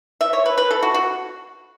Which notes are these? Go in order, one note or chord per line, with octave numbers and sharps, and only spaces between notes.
E5
C#5
B4
B4
A4
F#4
F#4